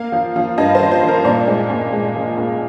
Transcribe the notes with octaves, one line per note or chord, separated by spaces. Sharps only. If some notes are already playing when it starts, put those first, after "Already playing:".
Already playing: A#3 F5
F3
F3
G2 D#5
F3 C5
C5
F3
A#4
A#2 D5
G#3
A#2
G#3
F3
A#2